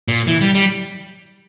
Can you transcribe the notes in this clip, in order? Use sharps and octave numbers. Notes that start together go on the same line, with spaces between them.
A#2
E3
G3
G3